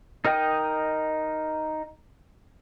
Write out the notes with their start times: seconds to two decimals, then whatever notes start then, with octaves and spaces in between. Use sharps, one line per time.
0.25 D#4 A#4 D#5 G5 D#6